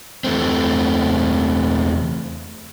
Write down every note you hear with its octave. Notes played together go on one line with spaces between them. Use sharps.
E2 A3 C4